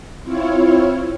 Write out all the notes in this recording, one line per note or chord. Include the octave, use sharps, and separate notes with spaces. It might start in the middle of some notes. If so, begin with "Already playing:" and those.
C4 E4 F4 C#5